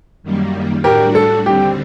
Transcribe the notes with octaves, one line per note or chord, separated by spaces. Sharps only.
F#2 D#3 G3 A#3
A2 G3 D4 F#4 G4 A#4
A4
D#2 D3 G3 C4 G4